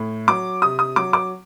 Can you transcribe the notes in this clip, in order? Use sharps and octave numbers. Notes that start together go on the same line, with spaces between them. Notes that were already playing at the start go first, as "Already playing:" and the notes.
Already playing: A2
F#3 D6
C3 D#6
D#6
F#3 D6
D6